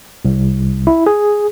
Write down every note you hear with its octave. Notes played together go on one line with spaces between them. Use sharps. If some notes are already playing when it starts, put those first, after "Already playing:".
C2
E4
G#4